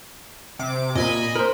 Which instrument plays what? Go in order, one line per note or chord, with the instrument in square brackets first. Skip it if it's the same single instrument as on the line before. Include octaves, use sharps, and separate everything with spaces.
[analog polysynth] C3 D6
[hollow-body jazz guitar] A#2 A#3 [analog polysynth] D#5 G#5 B5
[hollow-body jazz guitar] A#4 C5